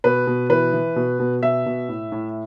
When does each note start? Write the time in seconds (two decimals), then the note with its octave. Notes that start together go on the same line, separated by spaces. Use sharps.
0.04 B2 B4
0.27 B2
0.50 E3 B4
0.73 E3
0.96 B2
1.20 B2
1.42 B2 E5
1.66 B2
1.89 A2
2.12 A2